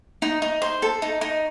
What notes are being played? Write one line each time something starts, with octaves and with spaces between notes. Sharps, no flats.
D#4
D#4
C5
A4
D#4
D#4